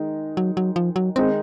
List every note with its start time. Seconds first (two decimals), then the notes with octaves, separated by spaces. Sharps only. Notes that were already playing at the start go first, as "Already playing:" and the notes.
Already playing: D#3 G#3 D#4
0.37 F#3
0.57 F#3
0.76 F3
0.96 F#3
1.16 D#3 G#3 C4 D#4